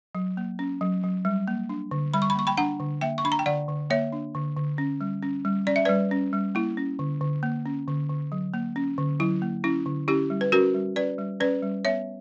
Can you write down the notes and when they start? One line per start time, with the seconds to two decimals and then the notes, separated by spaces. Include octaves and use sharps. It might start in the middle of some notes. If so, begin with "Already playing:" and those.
0.15 F#3
0.37 A#3
0.59 C#4
0.81 F#3
1.03 F#3
1.25 G3
1.48 A#3
1.69 D4
1.91 D3
2.14 G3 B5
2.22 C#6
2.30 B5
2.35 A#3 C#6
2.47 G5 B5
2.57 D4 F#5 A#5
2.80 D3
3.01 A#3 E5 G5
3.18 C#6
3.24 D4 B5
3.32 A#5
3.39 G5
3.46 D3 D5 F#5
3.68 D3
3.90 A#3 C#5 E5
4.12 D4
4.35 D3
4.57 D3
4.78 C#4
5.01 G3
5.23 C#4
5.45 G3
5.67 C#4 D5
5.76 E5
5.85 G3 B4 D5
6.11 C#4
6.33 G3
6.55 A#3 E4
6.77 C#4
6.99 D3
7.21 D3
7.43 A#3
7.66 C#4
7.88 D3
8.10 D3
8.32 F#3
8.54 A#3
8.76 C#4
8.98 D3
9.20 F#3 E4
9.42 A#3
9.64 C#4 E4
9.86 D3
10.08 C#4 E4 G4
10.30 G3
10.41 B4
10.52 C#4 F#4 A#4
10.74 G3
10.96 C#4 B4 D5
11.18 G3
11.40 C#4 B4 D5
11.63 G3
11.85 B3 C#5 E5